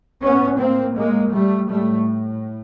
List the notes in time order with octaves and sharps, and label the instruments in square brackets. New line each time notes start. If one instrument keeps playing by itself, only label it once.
[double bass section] A2 B3 C#4
A#3 C4
G#3 A#3
G3 A3
A2 G3 A3